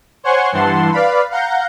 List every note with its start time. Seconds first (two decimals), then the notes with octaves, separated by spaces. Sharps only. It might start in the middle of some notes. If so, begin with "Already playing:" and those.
0.23 C5 C#5 F#5 G#5 C6 C#6
0.52 G2 E3 F#5 A5 C6
0.92 B4 D5 F5 B5
1.31 F5 F#5 A#5 G6